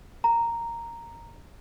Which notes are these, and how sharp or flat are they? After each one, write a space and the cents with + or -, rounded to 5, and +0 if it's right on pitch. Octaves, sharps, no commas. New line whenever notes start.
A#5 -5